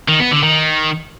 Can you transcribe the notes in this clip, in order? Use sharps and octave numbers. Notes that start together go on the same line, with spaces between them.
D#3
B3
D3
D#3